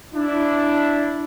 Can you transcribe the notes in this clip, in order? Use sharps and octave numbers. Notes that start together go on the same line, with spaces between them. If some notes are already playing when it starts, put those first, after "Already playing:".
D4 E4